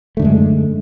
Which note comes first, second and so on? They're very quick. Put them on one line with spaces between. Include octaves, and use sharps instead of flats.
A3 D3 F#2 G#3